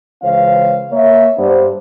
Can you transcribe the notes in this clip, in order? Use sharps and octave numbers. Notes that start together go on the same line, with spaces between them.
C#2 E3 C#4 C5 F5
A#3 C#5 E5
G2 B3 D4 C5